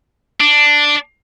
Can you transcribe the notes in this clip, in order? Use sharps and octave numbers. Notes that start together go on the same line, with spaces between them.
D4